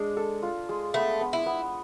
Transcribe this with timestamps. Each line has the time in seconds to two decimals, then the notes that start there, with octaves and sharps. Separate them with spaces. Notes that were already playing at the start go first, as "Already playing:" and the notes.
Already playing: G#3 D4
0.17 A4
0.43 F4
0.69 G#3
0.94 A3 B3
1.21 B3
1.33 E4
1.46 B3